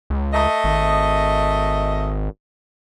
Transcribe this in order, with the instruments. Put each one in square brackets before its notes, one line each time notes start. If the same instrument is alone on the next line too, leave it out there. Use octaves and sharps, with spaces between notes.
[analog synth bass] C#2
[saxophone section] A3 D#5
[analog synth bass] G#1